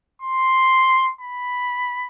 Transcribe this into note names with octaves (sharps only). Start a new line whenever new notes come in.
C6
B5